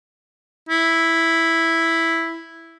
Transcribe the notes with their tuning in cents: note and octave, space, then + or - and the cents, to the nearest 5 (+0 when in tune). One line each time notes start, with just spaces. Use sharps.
E4 +0